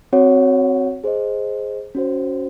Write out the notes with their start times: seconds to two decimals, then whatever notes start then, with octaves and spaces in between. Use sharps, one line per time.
0.13 C4 F#4 C#5 F#5
1.04 G#4 C5 D#5
1.95 C#4 F#4 C5